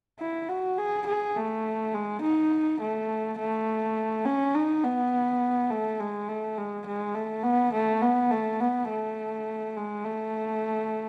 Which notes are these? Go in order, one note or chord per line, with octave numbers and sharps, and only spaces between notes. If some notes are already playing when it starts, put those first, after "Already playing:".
E4
F#4
G#4
G#4
A3
G#3
D#4
A3
A3
C#4
D#4
B3
A3
G#3
A3
G#3
G#3
A3
B3
A3
B3
A3
B3
A3
G#3
A3